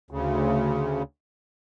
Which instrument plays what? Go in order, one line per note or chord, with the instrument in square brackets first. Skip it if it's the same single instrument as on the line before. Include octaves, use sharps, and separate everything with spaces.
[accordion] D2 C#3